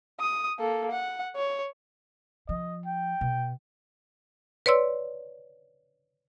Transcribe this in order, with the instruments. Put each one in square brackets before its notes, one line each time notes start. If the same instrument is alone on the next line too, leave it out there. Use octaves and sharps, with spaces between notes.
[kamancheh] D#6
A#3 A4
F#5
C#5
[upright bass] F3 [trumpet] D#5
[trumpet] G5
[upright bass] B2
[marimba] B4 C#5 D5 C6 E6